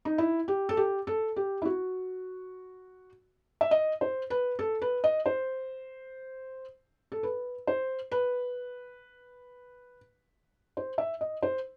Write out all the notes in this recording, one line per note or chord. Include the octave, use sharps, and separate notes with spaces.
D#4
E4
G4
A4
G4
A4
G4
E4
F#4
E5
D#5
C5
B4
A4
B4
D#5
C5
A4
B4
C5
B4
C5
E5
D#5
C5